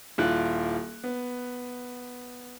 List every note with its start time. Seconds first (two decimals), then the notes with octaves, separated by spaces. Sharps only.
0.18 D#1 E4 F4 F#6
1.04 B3